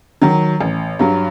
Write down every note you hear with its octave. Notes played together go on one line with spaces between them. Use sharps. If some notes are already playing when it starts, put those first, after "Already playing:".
D#3 F#3
A1
G2 F#3